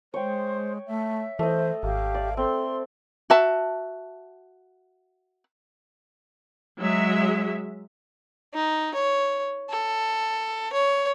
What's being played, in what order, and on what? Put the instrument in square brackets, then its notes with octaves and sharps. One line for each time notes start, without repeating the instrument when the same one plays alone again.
[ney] G#3 [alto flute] C5 [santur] C#5 G5
[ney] A3 [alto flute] E5
[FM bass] E3 [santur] A3 D#5 [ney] C5
[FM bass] G#1 [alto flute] G4 [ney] F5
[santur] D5
[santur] C4 [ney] A4 [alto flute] C6
[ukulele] F#4 E5 A5
[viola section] F#3 G#3 E5
[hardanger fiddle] D#4
C#5
A4
C#5